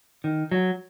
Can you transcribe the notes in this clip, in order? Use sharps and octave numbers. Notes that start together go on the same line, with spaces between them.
D#3
F#3